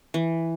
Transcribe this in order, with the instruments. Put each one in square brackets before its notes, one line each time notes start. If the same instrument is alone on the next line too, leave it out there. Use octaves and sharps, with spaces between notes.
[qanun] E3